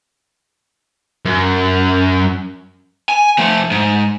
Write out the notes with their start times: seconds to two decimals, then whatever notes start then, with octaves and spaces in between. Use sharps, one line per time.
1.25 F#2
3.09 G#5
3.38 F3 A3
3.71 G#2